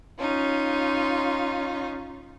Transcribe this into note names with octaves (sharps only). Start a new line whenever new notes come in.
C#4 D#4 F4